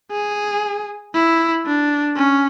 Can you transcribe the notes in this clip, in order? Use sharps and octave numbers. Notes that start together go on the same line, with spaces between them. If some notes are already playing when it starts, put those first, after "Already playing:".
G#4
E4
D4
C#4